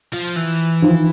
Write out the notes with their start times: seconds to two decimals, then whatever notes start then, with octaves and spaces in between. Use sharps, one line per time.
0.13 F3
0.36 E3
0.82 D#3 F3